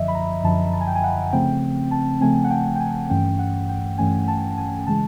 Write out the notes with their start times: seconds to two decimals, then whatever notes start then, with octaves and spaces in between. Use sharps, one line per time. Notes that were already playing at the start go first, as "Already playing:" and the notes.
Already playing: F#2 D3 F3 D#5 E5
0.08 B5
0.15 A#5
0.44 F#2 D3 F3 A5
0.73 A5
0.81 G#5
0.87 G5
0.95 G#5
1.04 F#5
1.33 C#3 F3 A3 C4 G5
1.91 A5
2.21 C#3 F3 A3 C4 G#5
2.44 F#5
2.51 G5
2.76 G5
2.80 G#5
3.10 G2 E3 A3 C#4 G5
3.39 F#5
3.69 G5
3.98 G2 E3 A3 C#4 G#5
4.28 A5
4.58 G#5
4.86 C#3 E3 G#3 A5